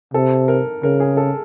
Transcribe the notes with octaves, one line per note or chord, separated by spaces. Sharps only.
C3 A4
A#4
C#3 A#4
G#4
A4